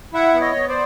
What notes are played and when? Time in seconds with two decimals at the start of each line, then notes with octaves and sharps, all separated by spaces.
0.13 E4 E5 F#5
0.34 B3
0.41 C#5 D#5
0.55 B3
0.68 C5 D5